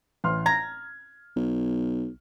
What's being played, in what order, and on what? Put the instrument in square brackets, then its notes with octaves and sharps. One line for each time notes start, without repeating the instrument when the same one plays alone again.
[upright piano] A1 C6 F6
[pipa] A#5 [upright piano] G#6
[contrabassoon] B1